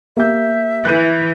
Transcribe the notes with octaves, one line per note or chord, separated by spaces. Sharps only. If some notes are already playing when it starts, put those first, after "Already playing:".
A#3 G4 E5 G6
E3 F#6 G6 D#7